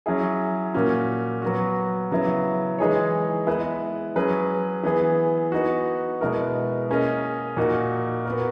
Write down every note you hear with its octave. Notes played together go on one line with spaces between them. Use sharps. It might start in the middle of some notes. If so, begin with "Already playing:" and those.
F#3 C#4 E4 G#4
A#2 A#3 C#4 F#4
F#3 B3 F#4
C#3 F#3 B3 E4
E3 G#3 D#4 G#4 C#5
G#3 B3 E4 B4
F#3 C#4 G#4 B4
E3 B3 E4 G#4
B3 D#4 F#4
B2 G#3 B3 E4 A#4
A#3 C#4 G#4 D#5
A#2 A#3 D#4 F#4
B3 F#4 A#4